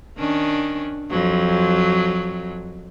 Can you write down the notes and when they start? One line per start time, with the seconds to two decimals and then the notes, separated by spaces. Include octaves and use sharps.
0.18 D#3 C#4 D4
1.11 F2 F#3